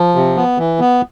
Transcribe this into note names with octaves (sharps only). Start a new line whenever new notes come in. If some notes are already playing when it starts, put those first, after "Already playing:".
Already playing: F3
C3
B3
E3
B3